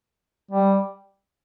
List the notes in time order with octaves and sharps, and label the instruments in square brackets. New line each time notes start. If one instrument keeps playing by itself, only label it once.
[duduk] G3